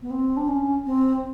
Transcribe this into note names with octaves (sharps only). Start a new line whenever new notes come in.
B3
C4
D4
C#4
C4